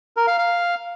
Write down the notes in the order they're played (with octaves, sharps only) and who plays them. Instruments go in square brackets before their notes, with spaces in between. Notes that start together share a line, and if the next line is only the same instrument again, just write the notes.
[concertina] A#4
F5
F5